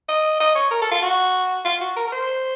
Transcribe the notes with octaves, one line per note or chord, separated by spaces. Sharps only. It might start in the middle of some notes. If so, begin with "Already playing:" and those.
D#5
D#5
C#5
A#4
A4
F4
F#4
F4
F#4
A#4
A#4
C5